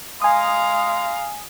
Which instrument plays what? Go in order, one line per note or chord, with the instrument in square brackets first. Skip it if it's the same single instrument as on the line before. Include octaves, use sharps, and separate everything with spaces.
[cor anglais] G#3 [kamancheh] F5 A#5 [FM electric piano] G#5 D#6